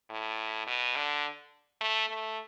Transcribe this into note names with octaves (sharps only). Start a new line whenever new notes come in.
A2
B2
D3
A3
A3